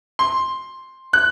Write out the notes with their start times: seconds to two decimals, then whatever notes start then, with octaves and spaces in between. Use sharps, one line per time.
0.19 C6
1.13 F#6